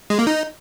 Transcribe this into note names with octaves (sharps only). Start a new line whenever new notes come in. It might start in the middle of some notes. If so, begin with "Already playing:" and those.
G#3
A#3
D#4